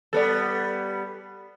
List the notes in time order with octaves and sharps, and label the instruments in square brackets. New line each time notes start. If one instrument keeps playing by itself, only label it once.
[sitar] G3 B3 [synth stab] A4 D5